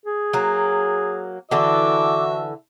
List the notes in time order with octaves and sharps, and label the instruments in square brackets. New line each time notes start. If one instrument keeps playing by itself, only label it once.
[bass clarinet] G#4
[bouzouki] F#3 A#3
[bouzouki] D3 E3 A4 [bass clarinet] F#4 [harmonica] E5 [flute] D6